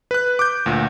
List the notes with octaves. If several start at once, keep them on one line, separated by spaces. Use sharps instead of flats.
B4 F#6
D6 G6
D2 A#2